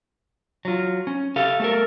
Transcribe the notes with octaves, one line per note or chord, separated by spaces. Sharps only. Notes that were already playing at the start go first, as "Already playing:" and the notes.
F#3 F4
C#4
G4 A4 F5
A3 A4 A#4